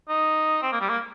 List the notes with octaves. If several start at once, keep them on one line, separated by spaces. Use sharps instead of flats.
D#4
C4
A#3
G3
A#3